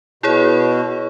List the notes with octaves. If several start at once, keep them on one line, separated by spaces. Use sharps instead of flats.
B2 E4 G#4 C#5